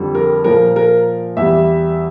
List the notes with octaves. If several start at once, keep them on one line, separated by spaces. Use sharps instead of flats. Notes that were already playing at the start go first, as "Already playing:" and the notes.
Already playing: F2 D3 G3
A#4
A#2 F3 A#4
A#4
E2 E3 G3 E5